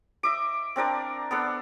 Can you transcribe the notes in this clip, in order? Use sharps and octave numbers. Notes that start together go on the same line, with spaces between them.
D#5 E5 D6
C4 D4 A#4 D5
B3 D4 A4